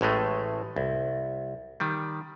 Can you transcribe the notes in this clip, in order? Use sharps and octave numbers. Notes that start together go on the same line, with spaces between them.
A1 A2 G#3 A3
C2
D#3 G3